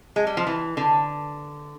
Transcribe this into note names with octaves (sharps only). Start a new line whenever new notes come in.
G#3
G3
F3
E3
D3